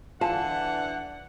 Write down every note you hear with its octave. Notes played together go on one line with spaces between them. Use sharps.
D3 E3 F4 F5 F#5 G#5 A5